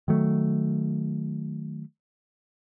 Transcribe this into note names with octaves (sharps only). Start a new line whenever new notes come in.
D#3 F#3 A3